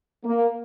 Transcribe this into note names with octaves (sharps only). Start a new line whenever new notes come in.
A#3